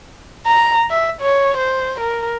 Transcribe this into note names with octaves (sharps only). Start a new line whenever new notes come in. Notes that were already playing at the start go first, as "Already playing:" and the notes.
A#5
E5
C#5
C5
A#4